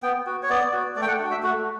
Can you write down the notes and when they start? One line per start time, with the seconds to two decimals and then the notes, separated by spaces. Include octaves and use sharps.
0.03 B3 G5
0.27 F#4
0.43 C#5
0.49 B3 D5
0.73 F#4
0.96 A3 D5
1.02 G5
1.08 F#5
1.19 D4 F#4
1.31 E5
1.43 A3 F#4